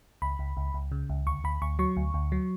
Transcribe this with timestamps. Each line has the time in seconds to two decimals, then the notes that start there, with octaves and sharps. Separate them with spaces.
0.22 C#2 B5
0.39 C#2
0.57 C#2
0.74 C#2
0.92 C#3
1.10 C#2
1.27 D2 C#6
1.44 D2 B5
1.62 D2 C#6
1.79 F#3 C#6
1.97 D2
2.14 D2
2.32 F#3